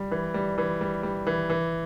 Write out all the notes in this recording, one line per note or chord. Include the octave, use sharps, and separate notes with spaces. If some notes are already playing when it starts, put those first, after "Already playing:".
Already playing: G3
E3
G3
E3
G3
G3
E3
E3